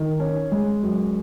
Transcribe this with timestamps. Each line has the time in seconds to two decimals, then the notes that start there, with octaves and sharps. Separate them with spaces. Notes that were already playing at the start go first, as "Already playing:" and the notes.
Already playing: D#3
0.20 C#4
0.52 G#3
0.82 F#2